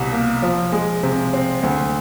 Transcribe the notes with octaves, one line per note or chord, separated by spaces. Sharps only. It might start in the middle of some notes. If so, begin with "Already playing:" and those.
Already playing: C2 B2
A#3
F3
G#3
C3
C4
D2